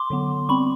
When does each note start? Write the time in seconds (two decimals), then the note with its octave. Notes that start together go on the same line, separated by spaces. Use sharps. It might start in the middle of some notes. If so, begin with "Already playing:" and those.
Already playing: C6 D6
0.10 D3 F#3 B3
0.49 G3 C4 B5 C#6